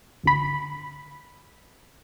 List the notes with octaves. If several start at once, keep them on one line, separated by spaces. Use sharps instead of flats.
G#1 D2 B5